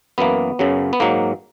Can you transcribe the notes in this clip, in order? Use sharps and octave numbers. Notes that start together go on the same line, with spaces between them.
F#2 E3 A#3 B3
F#2 C#3 F#3
B3
G#2 F#3 A#3